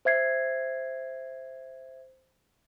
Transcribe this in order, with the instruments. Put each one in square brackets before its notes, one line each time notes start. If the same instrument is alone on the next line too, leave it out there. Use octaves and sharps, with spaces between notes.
[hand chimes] C5 E5 G#6 C7